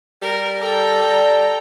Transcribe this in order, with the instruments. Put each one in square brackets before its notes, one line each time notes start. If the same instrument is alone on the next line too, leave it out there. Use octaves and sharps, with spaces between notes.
[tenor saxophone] G3 [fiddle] A#4
[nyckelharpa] A4 [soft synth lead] D5 [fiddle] G5 A#5